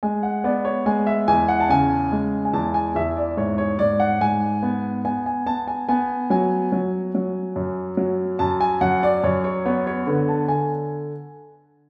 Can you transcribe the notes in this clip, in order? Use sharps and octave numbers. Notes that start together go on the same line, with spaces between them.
G#3 G#5
F#5
B3 D5
C#5
G#3 G#5
E5
E2 G#5
F#5
A5
C#3 G#5
G#3
G#5
E2 A5
G#5
E2 E5
D5
G#2 C#5
C#5
G#2 D5
F#5
G#2 G#5
B3
B3 G#5
G#5
B3 A5
G#5
B3 G#5
F#3 G#5
F#3
F#3
F#2
F#3
F#2 A5
G#5
F#2 F#5
D5
F#2 C#5
C#5
B3 C#5
C#5
D3 B4
A5
D3 G#5